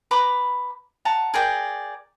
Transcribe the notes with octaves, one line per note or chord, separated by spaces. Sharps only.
B4 A#5 B5 D6
F#5 A5 A#5
G#4 A#4 D5 G5